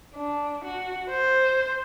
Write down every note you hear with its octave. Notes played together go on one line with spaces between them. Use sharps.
D4
F#4
C5